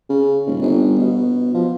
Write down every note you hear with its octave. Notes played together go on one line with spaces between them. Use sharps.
C#3
D#1
G1
B2
F3